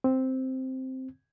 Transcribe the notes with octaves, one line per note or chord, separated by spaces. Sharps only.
C4